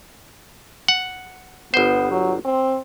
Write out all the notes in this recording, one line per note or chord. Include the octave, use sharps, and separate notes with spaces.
F#5
G1 B3 C5
F#3
C4